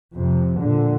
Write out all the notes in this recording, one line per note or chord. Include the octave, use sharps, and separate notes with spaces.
F2 C3
A#2 D3